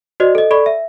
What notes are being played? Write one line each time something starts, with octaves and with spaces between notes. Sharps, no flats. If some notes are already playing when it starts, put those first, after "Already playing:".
F#4 C5 D5 D#5
A4 D#5
A4 D5 B5 C#6
E5